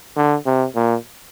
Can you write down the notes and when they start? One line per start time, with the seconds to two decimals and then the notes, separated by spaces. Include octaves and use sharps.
0.16 D3
0.46 C3
0.75 A#2